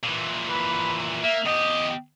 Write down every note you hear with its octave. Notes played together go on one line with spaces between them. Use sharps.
A#2 E3
B4
A#3 E5
E2 G4 D#5